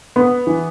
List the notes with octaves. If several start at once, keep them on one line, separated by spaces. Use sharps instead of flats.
B3
E3